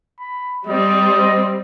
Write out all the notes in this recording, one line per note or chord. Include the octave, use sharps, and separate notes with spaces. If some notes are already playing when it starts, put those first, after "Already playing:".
B5
G3 C4 D#5